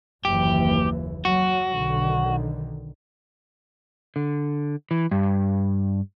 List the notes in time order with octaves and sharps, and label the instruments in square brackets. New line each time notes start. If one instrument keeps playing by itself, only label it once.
[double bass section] F#1 D#2 E3 [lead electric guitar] G4
[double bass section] F#3 [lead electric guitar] F#4
[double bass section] B1 D3 D#3
[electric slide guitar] D3
E3
G2